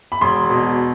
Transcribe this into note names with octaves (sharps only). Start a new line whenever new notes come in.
B5
E1 C6
B2